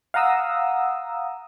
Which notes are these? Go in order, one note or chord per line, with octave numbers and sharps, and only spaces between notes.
F5 F#5 A#5 D#6 E6